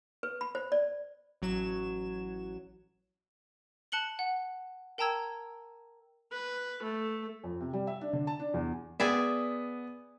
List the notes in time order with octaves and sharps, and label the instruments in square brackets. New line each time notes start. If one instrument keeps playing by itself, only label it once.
[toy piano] B4
B5
C5
D5
[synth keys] A1 F#3 G#6 E7
[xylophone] A5 F#6 C#7 F#7 G7
F#5
A#4 G5 A5 A#5 E6 G#6
[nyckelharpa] B4
A3
[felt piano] F2
C3
G3
E5
D4
D3
A5
D4
E2
[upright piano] B3 [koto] G#4 D5 E5